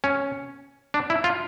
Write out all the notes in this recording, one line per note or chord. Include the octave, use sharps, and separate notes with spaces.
C#4
D4
E4
F4